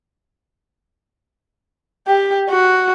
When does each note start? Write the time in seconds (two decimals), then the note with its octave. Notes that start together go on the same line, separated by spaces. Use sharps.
2.07 G4
2.49 F#4